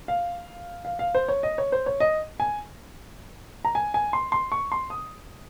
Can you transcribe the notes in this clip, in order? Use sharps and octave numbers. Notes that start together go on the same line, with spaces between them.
F5
F5
F5
C5
C#5
D#5
C#5
C5
C#5
D#5
G#5
A#5
G#5
G#5
C6
C6
C#6
C6
D#6